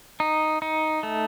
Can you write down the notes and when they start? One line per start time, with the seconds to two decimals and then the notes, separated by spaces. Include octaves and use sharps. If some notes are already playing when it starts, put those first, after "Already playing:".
0.20 D#4
0.62 D#4
1.03 A3